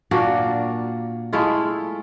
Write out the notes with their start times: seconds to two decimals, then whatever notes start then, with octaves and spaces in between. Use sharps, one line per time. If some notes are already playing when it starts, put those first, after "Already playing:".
0.11 A#2 A#3 D4 F#4
1.33 G#3 A3 E4 F4